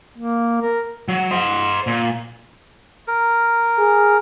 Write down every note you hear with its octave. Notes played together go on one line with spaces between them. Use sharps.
A#3
A#4
F#3
C5 D#5
A#2
A#4
G#4